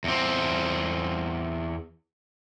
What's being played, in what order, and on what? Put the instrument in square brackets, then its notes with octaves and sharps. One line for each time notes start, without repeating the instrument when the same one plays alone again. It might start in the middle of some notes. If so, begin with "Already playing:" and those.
[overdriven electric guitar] E2 C4